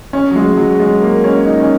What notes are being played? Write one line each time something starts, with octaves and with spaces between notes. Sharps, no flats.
C#4
F#3
G#3
G#3
F#3
G#3
A#3
C#4
D#4
C#4